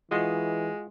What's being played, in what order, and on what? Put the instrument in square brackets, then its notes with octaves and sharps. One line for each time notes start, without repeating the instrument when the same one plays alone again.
[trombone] E3 [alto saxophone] G#3 [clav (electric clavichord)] F4 F#4 D#5